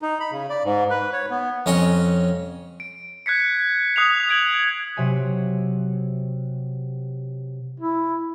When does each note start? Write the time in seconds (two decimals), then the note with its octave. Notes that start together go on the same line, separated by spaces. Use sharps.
0.02 D#4
0.20 B5
0.32 C#3
0.50 D5
0.64 G#2
0.90 B4
1.13 C#5
1.30 B3
1.66 F2 C#4 D#5 C#6
2.80 D7
3.26 F#6 G#6 B6 C#7
3.96 D#6 F#6 C7 F7
4.29 G#6 D7 F#7
4.96 C3 F#3 E5 G#5 C#7
7.80 E4